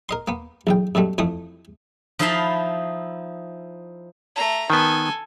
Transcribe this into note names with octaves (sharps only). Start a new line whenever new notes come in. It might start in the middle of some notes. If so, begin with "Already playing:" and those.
A#4 D#5 C6
A#3 B3
B1 E2 G5
F#2 B2 G3 A3
F2 E3 A3 D#6
F3 D#4 E4 F5 A5 B5
A3 A#5
D#3 B3 A4 G#5